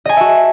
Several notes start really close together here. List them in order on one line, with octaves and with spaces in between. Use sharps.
D#5 G#5 A5 E5 F#4